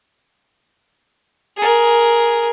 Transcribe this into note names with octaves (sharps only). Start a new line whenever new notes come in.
G#4 A#4